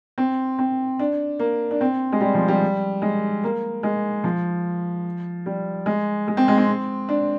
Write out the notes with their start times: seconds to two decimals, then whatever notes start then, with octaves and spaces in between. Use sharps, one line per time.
0.18 C4
0.59 C4
0.99 D4
1.39 A#3
1.71 D4
1.81 C4
2.12 G#3
2.21 G3
2.34 F3
2.48 G3
3.02 G#3
3.44 A#3
3.83 G#3
4.24 F3
5.46 G3
5.86 G#3
6.28 G#3
6.37 C4
6.48 G#3
6.58 C4
7.09 D4